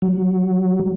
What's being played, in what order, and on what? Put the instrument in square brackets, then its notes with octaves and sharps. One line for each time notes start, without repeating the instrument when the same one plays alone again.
[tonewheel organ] F#3